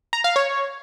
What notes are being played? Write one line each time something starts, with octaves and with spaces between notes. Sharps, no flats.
A#5
F5
C#5